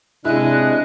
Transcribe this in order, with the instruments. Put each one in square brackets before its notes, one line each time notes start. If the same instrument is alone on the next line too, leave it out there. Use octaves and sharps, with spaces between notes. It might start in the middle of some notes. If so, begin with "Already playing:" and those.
[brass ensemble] C3 D4 [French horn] G#3 [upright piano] E4 [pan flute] F#6